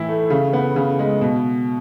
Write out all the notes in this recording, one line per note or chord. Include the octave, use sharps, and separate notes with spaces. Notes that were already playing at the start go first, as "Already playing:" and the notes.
Already playing: A2 E3 E4
A3
C#3
B3
C#3
G#3
B2